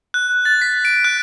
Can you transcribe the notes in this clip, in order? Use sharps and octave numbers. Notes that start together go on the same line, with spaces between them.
F#6
A6
B6
D7
F#6